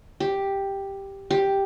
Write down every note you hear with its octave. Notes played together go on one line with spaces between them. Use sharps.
G4
G4